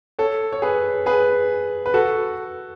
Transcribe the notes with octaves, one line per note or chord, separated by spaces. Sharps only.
A4 C#5
C#5
G#4 B4
G#4 B4
B4
F#4 A4